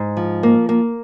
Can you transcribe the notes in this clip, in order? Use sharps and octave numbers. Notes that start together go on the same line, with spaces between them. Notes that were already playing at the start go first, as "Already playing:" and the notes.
Already playing: G#2
F3
A#3
A#3